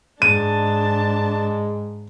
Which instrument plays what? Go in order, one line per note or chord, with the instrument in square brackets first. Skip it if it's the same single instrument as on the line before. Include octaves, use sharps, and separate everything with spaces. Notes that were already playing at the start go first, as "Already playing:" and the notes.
[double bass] G#2 [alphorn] G#3 [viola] D4 A5 [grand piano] D#7